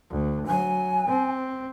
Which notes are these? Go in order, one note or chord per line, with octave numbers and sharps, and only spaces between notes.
D2
F#3 G#5
C4